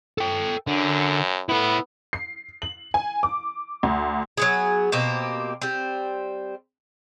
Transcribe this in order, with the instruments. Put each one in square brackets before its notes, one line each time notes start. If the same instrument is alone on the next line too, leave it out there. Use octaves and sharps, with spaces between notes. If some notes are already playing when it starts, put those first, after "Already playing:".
[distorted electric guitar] A4 G5
[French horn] F#2 [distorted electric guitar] D3
[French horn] B3 [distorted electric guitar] E4 A4
[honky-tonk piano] C7
F#7
G#5
D6
D2
[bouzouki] F#3 B3 G#4
B2 A#3 C4 G4
G3 C4